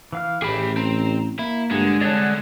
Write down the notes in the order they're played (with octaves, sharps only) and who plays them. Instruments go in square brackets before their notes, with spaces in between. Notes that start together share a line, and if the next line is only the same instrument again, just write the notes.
[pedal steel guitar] E3 F5 F6
[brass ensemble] A1 [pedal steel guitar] G4 E5 [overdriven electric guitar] G#4 B5
[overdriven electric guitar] C4 [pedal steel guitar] A#5
[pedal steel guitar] A#3 [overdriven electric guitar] E4
[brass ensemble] A#1 G2 [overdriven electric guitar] D3 [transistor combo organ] G#3
[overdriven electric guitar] C2 D3 [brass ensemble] C4 C#5 A5 [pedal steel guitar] D5 F#5